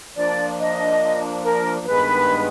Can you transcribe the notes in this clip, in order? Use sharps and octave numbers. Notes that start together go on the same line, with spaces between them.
F3 A#3 D4 D5
D#5
A#4
G2 D#3 G#3 B3 B4